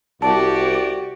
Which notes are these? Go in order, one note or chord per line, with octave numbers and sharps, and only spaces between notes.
C2 F#4 G4 D5 A5